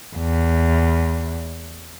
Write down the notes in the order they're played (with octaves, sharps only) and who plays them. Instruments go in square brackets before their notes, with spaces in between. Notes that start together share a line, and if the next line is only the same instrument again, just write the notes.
[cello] E2